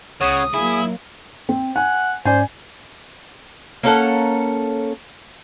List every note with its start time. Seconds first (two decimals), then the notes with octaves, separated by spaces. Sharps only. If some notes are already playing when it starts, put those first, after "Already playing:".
0.21 C#2 C#3 C#5 F#5 D#6
0.54 F#3 A#3 E4 G#4
1.49 C4
1.76 F#5 G#5
2.25 G#2 C#4 C5 D5 G#5
3.83 A#3 C#4 A4 F#5